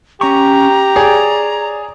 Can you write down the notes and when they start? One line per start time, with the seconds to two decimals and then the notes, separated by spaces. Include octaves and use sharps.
0.21 C#4 G4 A#5 C#6
0.96 G#4 C#5 D5